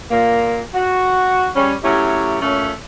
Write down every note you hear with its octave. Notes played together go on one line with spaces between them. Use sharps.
A#2 A#3
F#4
G3 C#4
F#3 A3 C#4 E4 G4
A#2 A3 C#4